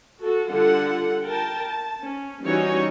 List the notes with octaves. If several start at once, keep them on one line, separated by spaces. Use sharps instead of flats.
F#4 A4
D3 G3 F4 A4 F#5
A#4 G5 A5
A5
C#4
E3 G3 C#4 D#4 F#4 C#5